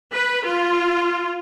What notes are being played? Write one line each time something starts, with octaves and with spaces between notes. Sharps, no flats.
B4
F4